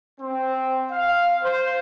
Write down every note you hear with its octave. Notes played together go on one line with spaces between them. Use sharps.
C4
F5
C5